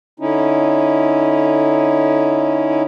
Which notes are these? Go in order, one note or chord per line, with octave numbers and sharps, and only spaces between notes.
D3 C#4 D#4 E4